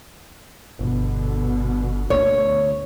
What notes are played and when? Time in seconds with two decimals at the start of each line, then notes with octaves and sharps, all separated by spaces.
0.79 G1 B2 D3 B3
2.10 D2 C#5